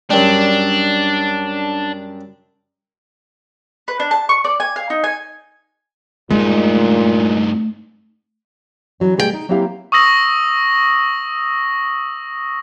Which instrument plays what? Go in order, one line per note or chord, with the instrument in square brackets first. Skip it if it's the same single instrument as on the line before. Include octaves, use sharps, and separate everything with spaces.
[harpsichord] F#2 G3 [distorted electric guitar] D4
[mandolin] B4
D4
A5
C#6
D5
G#5
F5
D#4
G#5
[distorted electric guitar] G2 D#4 [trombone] A#2 [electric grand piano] G#3 [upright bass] A3
[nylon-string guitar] E3 F#3 C#4
B2 G3 A3 G#4 A#4 G5
D#4
F#3 A#3 C4 E4 G4 F5
[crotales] C#6 D#6 E6 A#6 F#7